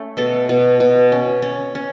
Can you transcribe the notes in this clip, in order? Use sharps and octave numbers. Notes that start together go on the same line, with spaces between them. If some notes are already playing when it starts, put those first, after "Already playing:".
Already playing: A3 C#4
B2 A4
B2
B2
C#4
C#4
C#4